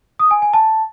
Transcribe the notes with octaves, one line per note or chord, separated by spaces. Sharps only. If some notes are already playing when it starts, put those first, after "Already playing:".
D#6
G#5
G#5
A5